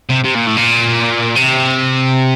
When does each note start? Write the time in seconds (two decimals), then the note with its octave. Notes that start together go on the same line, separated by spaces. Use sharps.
0.09 C3
0.24 C3
0.35 A#2
0.46 A2
0.57 A#2
1.36 C3